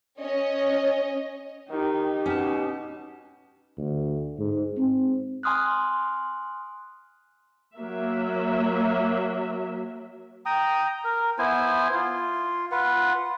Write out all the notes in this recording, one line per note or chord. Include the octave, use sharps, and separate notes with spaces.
C#4 C#5 D#5
D#3 D#4 G4
B2 C#4 A5
D2
G#2
C4
G#5 C6 D#6 F6 F#6
F#3 A#3 E5
G5 A#5 D#6
A#4
B3 E4 C5 G#5
F4
F4 B4 F#5